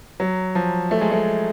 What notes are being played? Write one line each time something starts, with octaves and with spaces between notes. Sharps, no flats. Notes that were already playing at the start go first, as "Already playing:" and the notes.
F#3
F3
A3
G#3
A3